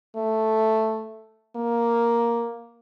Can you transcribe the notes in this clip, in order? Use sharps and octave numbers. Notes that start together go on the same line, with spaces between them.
A3
A#3